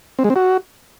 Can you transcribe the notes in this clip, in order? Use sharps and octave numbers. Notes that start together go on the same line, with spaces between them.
C4
G#3
C4
F#4